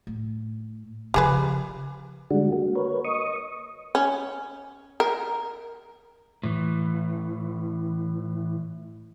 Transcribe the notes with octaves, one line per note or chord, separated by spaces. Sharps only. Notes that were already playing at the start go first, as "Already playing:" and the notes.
A2
C#3 F3 G4 G#4 B4
D3 G3 G#3 D4 F#4
A#3 F#4
A#4 B4 C#5
D#5 C#6 D#6
C#4
A#4
A2 E3